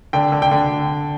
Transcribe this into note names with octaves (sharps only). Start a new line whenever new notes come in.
D3 G5
D3
G5
D3